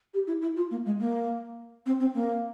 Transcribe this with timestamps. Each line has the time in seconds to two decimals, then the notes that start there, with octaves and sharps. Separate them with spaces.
0.14 G4
0.27 E4
0.42 E4
0.56 F4
0.71 A#3
0.85 G#3
1.00 A#3
1.86 C4
2.00 C4
2.15 A#3